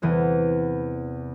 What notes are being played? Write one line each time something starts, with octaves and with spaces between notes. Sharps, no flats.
E2 C3 E3